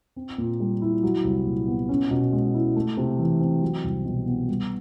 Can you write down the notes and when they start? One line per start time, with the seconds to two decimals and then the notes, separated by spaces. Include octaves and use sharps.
0.16 C4
0.38 A#2
0.60 G3
0.82 E4
1.03 F#3
1.24 C2
1.46 A#2
1.68 B3
1.89 C#4
2.11 B2
2.33 G#3
2.54 E4
2.76 A3
2.97 C3
3.19 E3
3.40 C4
3.62 F#3
3.84 C2
4.06 B2
4.27 B3
4.49 G3